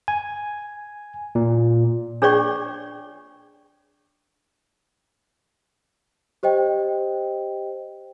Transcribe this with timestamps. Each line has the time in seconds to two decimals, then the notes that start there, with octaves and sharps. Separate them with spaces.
0.08 G#5
1.35 A#2
2.22 D4 G#4 C#5 D5 G5 C#6
6.43 G4 C5 D#5 G5